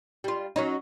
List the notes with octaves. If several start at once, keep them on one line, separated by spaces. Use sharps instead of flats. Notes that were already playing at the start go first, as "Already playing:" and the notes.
G3 F4
F#3 C#4 D#4